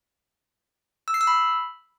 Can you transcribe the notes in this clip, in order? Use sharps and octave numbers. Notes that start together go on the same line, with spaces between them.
E6
C7
E6
B5